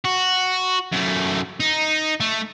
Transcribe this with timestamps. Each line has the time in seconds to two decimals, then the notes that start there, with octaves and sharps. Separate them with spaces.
0.05 F#4
0.92 F#2 A3
1.60 D#4
2.20 A3